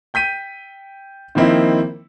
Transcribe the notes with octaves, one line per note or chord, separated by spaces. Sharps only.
G5 G6 B6 D#7
D#3 F3 A#3 C4 D#4 E4